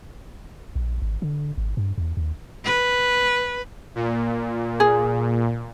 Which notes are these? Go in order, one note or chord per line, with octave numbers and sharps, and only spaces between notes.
A#1
G#1
D3
G#1
G2
E2
D#2
B4
A#2
G#4